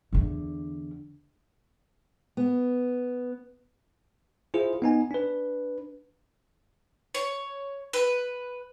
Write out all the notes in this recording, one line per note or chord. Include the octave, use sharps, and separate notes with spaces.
E2 D3
B3
E4 F4 G#4 C5
B3 D#4 G#5
D4 B4
C#5
B4